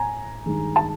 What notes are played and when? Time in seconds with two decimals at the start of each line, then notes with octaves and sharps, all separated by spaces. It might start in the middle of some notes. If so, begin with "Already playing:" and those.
Already playing: A2 G#5 A#5
0.46 G2 D#3 G#3
0.76 A5